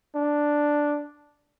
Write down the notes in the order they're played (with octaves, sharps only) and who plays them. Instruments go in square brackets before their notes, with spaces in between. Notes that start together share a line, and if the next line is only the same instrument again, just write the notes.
[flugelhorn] D4